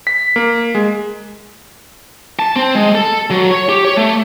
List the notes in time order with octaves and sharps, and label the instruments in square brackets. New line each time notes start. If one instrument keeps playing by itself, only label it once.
[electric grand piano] B6
A#3
G#3
[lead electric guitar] A5
C4
G#3
A4
F#3
C#5
G4
C#5
A3